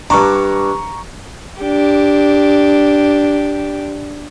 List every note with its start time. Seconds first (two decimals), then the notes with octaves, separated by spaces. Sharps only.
0.10 G2 D4 A#5 C#6
1.60 D4 G4